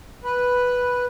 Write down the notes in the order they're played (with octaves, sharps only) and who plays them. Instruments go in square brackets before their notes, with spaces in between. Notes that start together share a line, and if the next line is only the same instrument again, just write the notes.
[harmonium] B4